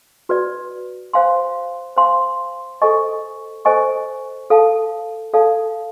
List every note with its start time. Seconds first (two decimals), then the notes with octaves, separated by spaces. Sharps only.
0.29 F#4 B4 D5
1.13 C5 F5 G#5 C6
1.97 C5 F5 G#5 C6
2.82 A4 C5 D#5 G#5 C#6
3.65 A4 C5 D#5 G#5 C#6
4.50 A4 D5 F5 A5
5.34 A4 D5 F5 A5